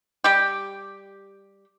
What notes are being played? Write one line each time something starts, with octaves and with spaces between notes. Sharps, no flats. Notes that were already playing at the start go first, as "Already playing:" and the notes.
G3 G4